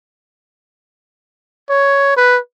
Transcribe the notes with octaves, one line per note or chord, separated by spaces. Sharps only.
C#5
B4